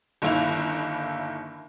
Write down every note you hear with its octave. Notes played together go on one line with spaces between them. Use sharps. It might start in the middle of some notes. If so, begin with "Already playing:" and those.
G1 D#3 A#3 E4 B5 F7